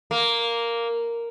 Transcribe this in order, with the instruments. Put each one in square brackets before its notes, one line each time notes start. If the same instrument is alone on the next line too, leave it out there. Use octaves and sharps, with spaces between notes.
[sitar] A#3